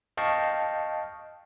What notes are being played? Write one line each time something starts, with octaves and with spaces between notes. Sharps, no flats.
D#5 F5 G5 A5 C#6